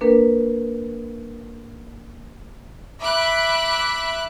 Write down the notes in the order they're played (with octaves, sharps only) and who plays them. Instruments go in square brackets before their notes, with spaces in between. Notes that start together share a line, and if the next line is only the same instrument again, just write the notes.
[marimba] A#3 D4 A#4 B4
[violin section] E5 B5 D6 F#6